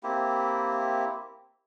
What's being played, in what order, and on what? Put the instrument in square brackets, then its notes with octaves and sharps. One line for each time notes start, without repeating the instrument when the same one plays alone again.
[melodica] A#3 C4 E4 G4